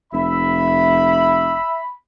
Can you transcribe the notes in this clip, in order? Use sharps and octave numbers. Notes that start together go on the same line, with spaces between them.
F1 E5 B5